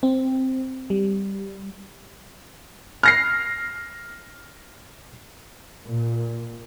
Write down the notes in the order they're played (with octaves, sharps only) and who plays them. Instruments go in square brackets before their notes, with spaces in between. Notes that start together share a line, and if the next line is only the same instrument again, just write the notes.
[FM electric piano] C4
G3
[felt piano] F6 A#6 C7
[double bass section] A#2